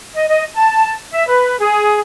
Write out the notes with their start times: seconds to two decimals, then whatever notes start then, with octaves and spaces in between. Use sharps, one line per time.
0.14 D#5
0.29 D#5
0.54 A5
1.12 E5
1.28 B4
1.60 G#4